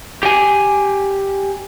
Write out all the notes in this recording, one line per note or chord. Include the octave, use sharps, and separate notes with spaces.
G4 G#5